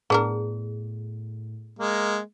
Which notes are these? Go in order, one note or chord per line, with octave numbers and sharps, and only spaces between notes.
A2 B3 D4 G#4 A#4
G#3 A#3